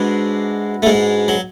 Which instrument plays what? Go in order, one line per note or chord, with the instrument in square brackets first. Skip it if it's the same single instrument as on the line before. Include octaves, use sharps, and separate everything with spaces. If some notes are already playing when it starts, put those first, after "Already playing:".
Already playing: [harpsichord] G#2 G#3 [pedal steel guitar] D4 F#4 B4 E5
[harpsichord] A3
G#2 G#3
F#3